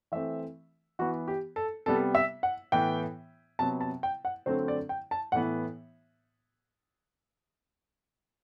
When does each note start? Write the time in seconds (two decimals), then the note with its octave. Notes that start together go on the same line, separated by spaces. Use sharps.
0.12 E3 A3 C4 E5
0.99 E3 B3 F#4
1.28 G4
1.56 A4
1.86 C3 G3 B3 A4
2.15 E5
2.43 F#5
2.72 A2 E3 B3 G5
3.59 C3 F#3 B3 A5
3.81 A5
4.03 G5
4.25 F#5
4.46 D3 F#3 A3 C4 C5
4.68 D5
4.89 G5
5.11 A5
5.32 A2 E3 B3 F#5